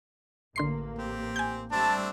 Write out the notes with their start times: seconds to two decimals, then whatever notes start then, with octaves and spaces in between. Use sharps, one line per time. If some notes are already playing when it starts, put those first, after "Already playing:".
0.56 A1 D3 A#3 C6 C7
0.99 C4 G4
1.36 G#5 G6
1.72 G3 A3 C4 D4 A5